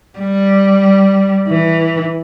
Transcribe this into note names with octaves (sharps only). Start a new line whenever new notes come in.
G3
E3